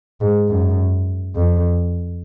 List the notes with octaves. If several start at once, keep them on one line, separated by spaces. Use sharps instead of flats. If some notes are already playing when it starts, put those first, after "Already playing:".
G#2
F#2
F2